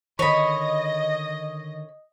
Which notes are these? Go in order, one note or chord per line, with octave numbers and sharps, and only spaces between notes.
D3 D#3 C#5 D#5 B5